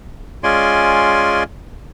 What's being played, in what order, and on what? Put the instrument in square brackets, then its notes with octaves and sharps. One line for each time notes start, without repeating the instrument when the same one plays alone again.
[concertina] G#3 C#4 F4 D5 G#5 C6